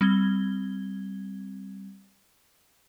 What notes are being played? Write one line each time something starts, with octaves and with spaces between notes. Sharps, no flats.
G3 C4 G#6 G7